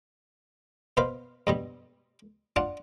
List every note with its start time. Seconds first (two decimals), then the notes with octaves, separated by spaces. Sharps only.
0.97 B2 B4 C5 F5
1.47 G2 B2 G3
2.56 D4 F4 F#5 A5